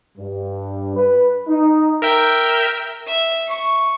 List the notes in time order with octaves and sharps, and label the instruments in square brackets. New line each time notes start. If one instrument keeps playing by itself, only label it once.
[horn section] G2
B4
D#4
[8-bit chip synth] A#4 E5 G5
[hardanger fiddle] E5
C#6